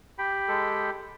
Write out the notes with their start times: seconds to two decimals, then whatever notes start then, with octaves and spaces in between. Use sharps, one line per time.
0.18 G4 G5 B5
0.48 G#3 A4